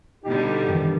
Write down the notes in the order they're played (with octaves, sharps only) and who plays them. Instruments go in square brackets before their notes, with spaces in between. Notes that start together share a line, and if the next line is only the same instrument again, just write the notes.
[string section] B2 D3 G3 [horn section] D#4 G4
[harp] G2 D#3 E3